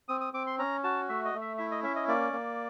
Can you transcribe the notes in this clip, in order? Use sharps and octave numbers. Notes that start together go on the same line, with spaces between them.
C4 D#6
D#6
C4 D6
C6
C#4 A#5
F#4 A5
A3 E5
D#5
A3
E5
E4 E5
D#5
C#4 E5
D#5
A#3 D5
A#3